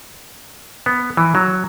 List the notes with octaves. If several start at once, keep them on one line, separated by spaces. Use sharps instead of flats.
B3
E3
F#3